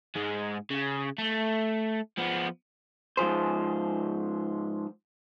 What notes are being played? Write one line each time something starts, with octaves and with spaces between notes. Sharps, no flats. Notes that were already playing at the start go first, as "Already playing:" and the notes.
G#2 G#3
C#3
A3
F3 B3
G#2 F3 G#4 C5